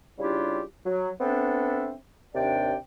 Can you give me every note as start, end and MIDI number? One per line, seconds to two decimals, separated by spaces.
0.19 0.61 49
0.19 0.61 55
0.19 0.61 62
0.19 0.61 64
0.19 0.61 65
0.19 0.61 67
0.86 1.10 54
1.21 1.92 59
1.21 1.92 60
1.21 1.92 62
1.21 1.92 69
1.21 1.92 76
2.35 2.74 39
2.35 2.74 48
2.35 2.74 62
2.35 2.74 74
2.35 2.74 79